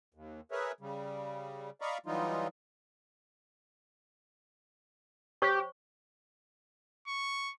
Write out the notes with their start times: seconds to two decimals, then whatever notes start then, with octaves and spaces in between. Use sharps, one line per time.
0.14 D#2
0.51 G#4 A#4 B4 C#5 E5
0.80 C#3 G3
1.81 D5 D#5 F5 A#5 B5 C#6
2.06 E3 F#3 G3 D#4 F4
5.42 G4 C5 C#5 C#6
7.07 C#6